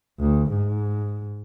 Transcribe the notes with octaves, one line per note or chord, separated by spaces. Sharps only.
D2
G#2